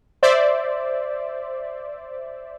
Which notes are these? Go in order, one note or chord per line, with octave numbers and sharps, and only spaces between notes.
C5 D5 E5